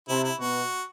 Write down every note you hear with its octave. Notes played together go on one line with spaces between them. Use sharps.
C3 E4
E4
B2 F#4